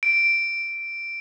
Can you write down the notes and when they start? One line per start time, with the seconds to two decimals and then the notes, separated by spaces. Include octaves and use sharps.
0.03 D7